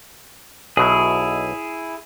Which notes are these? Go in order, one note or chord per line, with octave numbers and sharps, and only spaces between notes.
B1 B2 F#3 E4 G#4